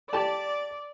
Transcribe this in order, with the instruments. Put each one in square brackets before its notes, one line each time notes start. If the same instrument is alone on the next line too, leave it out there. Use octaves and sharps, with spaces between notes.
[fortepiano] G4 A5 [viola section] D5